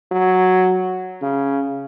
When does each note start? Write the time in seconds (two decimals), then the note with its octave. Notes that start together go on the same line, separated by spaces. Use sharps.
0.12 F#3
1.22 C#3